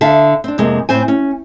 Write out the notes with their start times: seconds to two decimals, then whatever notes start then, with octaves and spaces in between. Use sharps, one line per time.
0.01 D3 E5 F5 A5
0.44 C4 D4
0.58 F2 C3 G#3 A#3
0.89 A2 C4 C5 G#5
1.08 C#4